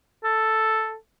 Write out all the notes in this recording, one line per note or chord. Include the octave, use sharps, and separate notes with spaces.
A4